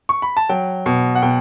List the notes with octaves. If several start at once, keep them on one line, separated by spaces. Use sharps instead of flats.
C#6
B5
A5
F#3 G5
B2
F#5
B2 G5